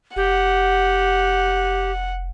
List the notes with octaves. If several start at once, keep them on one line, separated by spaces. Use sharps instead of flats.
F1 G4 F#5